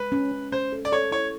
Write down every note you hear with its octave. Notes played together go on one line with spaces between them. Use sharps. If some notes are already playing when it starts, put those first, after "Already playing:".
Already playing: G#3 B4
C#4
C#4
C#4 C5
A4
D5
A4 C#5
E4 C#5